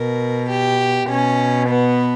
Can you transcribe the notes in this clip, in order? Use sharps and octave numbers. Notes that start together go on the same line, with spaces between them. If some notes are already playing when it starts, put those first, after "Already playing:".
Already playing: B2 A#4
G4
B2 C#4
B3